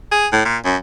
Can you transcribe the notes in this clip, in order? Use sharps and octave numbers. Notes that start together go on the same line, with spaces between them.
G#4
A2
A#2
F#2